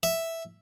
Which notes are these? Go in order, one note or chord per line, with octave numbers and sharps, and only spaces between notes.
E5